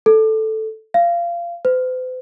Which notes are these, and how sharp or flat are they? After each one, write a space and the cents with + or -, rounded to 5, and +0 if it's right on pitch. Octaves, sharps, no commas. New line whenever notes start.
A4 -5
F5 -20
C5 -45